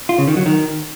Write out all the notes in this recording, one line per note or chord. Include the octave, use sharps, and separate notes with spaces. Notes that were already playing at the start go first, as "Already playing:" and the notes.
F4
C#3
D#3
F#3
D#3